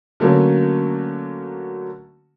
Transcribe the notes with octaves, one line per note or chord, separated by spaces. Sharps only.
D3 F#3 A3 A#3 C#4